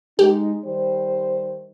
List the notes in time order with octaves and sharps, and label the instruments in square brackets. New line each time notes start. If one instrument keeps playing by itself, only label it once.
[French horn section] G#3 D#4 [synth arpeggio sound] G4
[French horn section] D#3 G3 C5